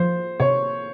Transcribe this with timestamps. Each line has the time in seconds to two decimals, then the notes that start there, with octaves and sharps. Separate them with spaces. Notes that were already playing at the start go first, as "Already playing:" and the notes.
Already playing: F3 C5
0.40 C3 C#5